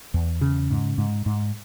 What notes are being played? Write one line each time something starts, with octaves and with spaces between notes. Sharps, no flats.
E2
C#3
G#2
G#2
G#2